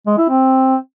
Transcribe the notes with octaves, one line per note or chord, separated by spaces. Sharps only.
G#3
E4
C4